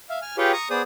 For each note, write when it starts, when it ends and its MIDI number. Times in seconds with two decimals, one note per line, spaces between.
0.10 0.19 76
0.10 0.19 77
0.22 0.37 80
0.22 0.37 89
0.38 0.52 65
0.38 0.52 67
0.38 0.52 68
0.38 0.52 71
0.38 0.52 73
0.38 0.52 79
0.53 0.68 82
0.53 0.68 85
0.53 0.68 87
0.70 0.82 59
0.70 0.82 68
0.70 0.82 72
0.70 0.82 74
0.70 0.82 87